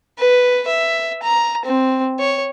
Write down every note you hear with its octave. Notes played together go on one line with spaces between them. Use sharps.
B4
E5
A#5
C4
C#5